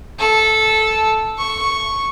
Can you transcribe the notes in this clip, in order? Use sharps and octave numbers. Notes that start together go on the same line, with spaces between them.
A4
C#6